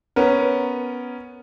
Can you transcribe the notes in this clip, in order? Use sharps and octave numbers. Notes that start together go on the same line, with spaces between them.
B3 C#4 A#4